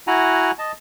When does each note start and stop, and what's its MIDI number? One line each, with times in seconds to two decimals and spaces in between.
0.07 0.51 64
0.07 0.51 66
0.07 0.51 78
0.07 0.51 80
0.07 0.51 82
0.59 0.72 75
0.59 0.72 81